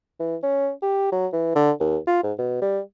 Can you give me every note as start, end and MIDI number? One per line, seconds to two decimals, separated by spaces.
0.20 0.36 52
0.43 0.71 61
0.82 1.11 67
1.12 1.27 54
1.33 1.53 52
1.56 1.71 50
1.80 1.97 39
2.07 2.22 65
2.23 2.33 44
2.38 2.58 47
2.62 2.80 55